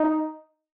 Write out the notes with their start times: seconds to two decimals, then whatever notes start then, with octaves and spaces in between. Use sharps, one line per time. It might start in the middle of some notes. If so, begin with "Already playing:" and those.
Already playing: D#4